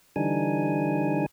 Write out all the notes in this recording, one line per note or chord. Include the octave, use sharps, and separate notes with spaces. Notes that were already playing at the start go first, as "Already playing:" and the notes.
D3 E3 G3 D4 D#4 G#5